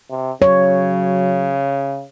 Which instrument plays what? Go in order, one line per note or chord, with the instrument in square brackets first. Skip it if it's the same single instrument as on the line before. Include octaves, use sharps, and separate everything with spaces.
[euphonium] C3
[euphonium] C#3 [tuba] F#3 [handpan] C#5